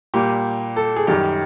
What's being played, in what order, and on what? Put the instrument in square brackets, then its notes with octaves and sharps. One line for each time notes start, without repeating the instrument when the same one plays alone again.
[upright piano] A#2 G3 A#3 G4
A4
G#4
F#2 D#3 G3 G4